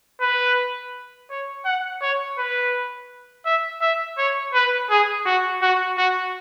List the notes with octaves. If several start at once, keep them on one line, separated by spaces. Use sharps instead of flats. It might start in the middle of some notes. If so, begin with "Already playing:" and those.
B4
C#5
F#5
C#5
B4
E5
E5
C#5
B4
G#4
F#4
F#4
F#4